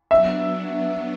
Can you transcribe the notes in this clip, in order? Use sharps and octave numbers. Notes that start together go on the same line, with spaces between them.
F#3 B3 D4 E5